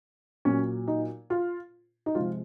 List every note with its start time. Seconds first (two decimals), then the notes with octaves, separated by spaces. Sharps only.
0.45 A#2 F#3 C#4
0.88 D#4
1.30 F4
2.06 D#4
2.15 C3 F3 G#3 F4